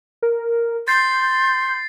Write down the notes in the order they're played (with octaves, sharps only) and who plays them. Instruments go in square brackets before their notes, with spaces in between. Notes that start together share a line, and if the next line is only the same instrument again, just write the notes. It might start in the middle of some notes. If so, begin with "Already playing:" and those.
[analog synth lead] A#4
[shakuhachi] C6 [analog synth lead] G6 [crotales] A6 C7